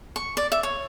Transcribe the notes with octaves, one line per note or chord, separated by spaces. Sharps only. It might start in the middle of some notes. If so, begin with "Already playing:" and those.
C#6
D5
E5
C#5